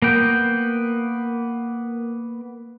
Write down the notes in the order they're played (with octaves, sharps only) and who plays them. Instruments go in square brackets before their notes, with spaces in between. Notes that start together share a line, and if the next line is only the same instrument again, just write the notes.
[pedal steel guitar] A#3 B3 G5